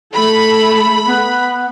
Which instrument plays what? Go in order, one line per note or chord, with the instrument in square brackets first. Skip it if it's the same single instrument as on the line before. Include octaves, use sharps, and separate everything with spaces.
[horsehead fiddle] A3 A4 [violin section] B5
[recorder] B3